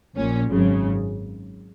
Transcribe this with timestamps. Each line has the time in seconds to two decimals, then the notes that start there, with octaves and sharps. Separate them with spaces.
0.15 A#1 A#2 C#4
0.51 G#1 F#2 C#3